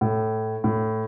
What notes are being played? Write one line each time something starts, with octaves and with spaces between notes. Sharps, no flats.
A2
A2